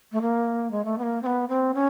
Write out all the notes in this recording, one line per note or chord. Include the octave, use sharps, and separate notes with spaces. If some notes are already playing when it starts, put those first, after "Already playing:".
A3
A#3
G#3
A3
B3
A#3
C4
B3
C4
C#4